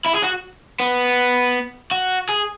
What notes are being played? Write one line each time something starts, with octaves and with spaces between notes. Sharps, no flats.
E4
G#4
F#4
B3
F#4
G#4